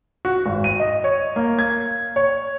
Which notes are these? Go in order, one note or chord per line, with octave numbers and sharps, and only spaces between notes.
F#4
G#1
D#7
D#5
C#5
A#3
G#6
C#5